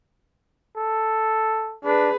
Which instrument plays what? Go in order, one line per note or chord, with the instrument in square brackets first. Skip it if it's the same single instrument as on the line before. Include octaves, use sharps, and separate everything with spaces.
[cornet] A4
[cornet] D4 [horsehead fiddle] G#4 B4